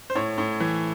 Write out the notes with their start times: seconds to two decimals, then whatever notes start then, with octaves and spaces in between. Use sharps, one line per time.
0.10 C5
0.15 A2 C#5
0.38 A2
0.60 E3